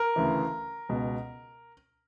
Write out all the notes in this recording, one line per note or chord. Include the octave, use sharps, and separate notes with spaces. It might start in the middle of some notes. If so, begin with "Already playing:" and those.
Already playing: A#4
D2 C#3 E3
C#2 B2